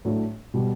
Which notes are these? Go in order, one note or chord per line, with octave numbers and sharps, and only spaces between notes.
A2 F#3 A3 D4
B2 G3